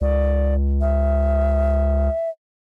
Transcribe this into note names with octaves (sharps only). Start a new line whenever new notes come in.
C#2 D5
E5